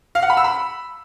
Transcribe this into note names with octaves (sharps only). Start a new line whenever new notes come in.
F5
F#5
B5
E6
B5